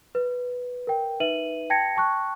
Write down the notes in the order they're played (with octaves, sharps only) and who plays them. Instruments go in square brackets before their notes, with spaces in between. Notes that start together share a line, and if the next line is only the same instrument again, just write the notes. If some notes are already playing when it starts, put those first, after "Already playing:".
[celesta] B4
A#4 G5
D#4 B4 E5 D#7 F#7
G5 A5 G#6 A#6 C#7
G5 A5 C#6 F#6